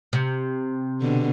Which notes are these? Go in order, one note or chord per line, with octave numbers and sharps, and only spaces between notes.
C3
B2 D3